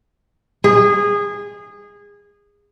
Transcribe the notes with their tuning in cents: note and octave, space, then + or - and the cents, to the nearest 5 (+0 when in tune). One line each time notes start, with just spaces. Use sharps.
G#4 -20